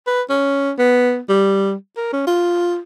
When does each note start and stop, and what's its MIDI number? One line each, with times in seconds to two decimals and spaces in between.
0.07 0.22 71
0.30 0.72 61
0.78 1.18 59
1.29 1.73 55
1.97 2.12 70
2.13 2.23 61
2.27 2.78 65